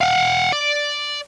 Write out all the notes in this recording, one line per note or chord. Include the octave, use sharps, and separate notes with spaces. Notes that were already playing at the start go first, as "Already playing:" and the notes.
F5 F#5
D5